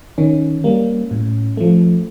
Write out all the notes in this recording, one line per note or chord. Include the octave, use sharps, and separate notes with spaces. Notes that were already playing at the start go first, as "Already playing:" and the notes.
D#3 C#4
G3 A#3
A2
F3 A3